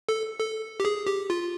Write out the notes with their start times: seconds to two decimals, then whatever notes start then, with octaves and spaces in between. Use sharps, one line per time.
0.09 A4
0.39 A4
0.80 G4
0.85 G#4
1.07 G4
1.30 F4